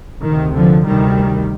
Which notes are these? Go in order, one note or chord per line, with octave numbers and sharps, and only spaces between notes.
D2 C3 D#3
D3 F3
D2 C3 D#3 G3